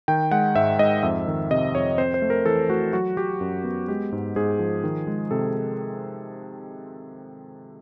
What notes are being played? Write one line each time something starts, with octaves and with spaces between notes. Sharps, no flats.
D#3 G5
G#3 F#5
G#2 E5
G#2 D#5
F2 E5
D#3
C3 D#5
F2 C#5
C4 C5
C5
A3
A#4
E3 A4
A3 F#4
F#3 F#4
F#3 G4
F#2
B3
G#3 G4
G#2
G#2 G#4
F3
D#3
G#3
C3 A4